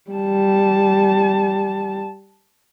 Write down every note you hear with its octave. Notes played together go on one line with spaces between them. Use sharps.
G3 A5